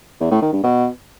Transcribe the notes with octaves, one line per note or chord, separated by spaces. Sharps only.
E2
A2
D#3
G2
B2